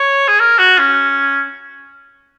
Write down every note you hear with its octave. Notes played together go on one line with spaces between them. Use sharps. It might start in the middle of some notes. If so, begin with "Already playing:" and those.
Already playing: C#5
G#4
A#4
F#4
C#4